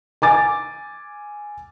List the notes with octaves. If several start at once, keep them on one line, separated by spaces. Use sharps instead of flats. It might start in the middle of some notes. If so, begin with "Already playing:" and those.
G#5 D6 A6